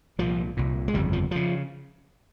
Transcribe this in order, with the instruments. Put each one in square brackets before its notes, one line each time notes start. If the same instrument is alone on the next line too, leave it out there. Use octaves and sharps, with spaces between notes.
[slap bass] C2 A#2 F3
C2 A#2
G#3
G1 F2 C#3 G3
F3
C#3 F3